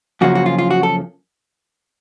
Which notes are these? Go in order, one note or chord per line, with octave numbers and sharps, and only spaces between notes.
F#2 C#3 F3 A#3 C#4 F#4
F#4
F4
F4
F#4
A4